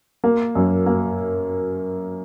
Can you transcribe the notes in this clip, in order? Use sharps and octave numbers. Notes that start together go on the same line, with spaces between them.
A#3
F#2
A#3